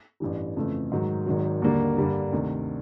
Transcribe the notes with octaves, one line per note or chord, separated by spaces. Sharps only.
A1 G2 E3 G3
F2 C#3 E3 A3
G#2 D#3 F#3
G#1 G#2 D#3 F#3
D#2 D3 G3 A#3
G2 D3 G3 A#3
D2 C3 D#3